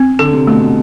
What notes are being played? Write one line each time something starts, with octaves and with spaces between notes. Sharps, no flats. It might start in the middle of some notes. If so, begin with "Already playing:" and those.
Already playing: C4
D3 A4
C3
B2 A3
B2